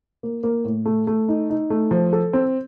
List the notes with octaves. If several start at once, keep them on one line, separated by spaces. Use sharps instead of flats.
A#3
A#3
A2
A3
A3
D#4
D#4
A3
F3
A4
C4